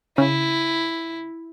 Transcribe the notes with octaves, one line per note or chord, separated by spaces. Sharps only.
C#3 E4